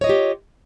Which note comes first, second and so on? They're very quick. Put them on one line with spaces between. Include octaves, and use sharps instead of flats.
C#5 D#5 F4 G4